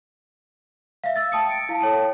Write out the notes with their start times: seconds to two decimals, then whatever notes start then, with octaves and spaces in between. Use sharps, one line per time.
1.04 E5 F5
1.16 E6 A6
1.32 G5 A5 D#6 C#7
1.49 C#7 D7
1.69 E4 F5 A5
1.81 A4 C#5 G5 A5